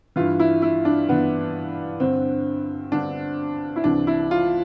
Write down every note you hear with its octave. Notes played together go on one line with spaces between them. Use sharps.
G2 E3 F4
E4
E4
D4
G2 E3 B3
G2 D3 C4
G2 D3 D4
E4
C2 C3 E3 D4
E4
F4